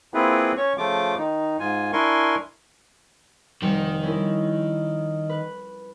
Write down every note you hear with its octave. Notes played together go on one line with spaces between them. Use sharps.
A#3 C4 E4 F4 G#4 B4
C#4 C#5 C#6
C#3 F3 A3 F4 D6
D#3 D#4
G#2 F4 G#5
D4 E4 A#4 G#5 C6 C#6
F1 D#3 G3 C#7
C#4 E4 A#4
B4